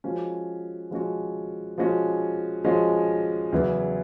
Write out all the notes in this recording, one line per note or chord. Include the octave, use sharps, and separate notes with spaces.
F3 G#3 C#4 F#4
F3 G#3 C#4 F#4
F3 G#3 C#4 F#4
F3 G#3 C#4 F#4
E2 C#3 F#3 B3 E4